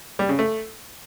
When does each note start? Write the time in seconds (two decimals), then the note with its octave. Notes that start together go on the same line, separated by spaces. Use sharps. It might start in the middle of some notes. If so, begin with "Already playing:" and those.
0.19 G3
0.29 C#3
0.39 A3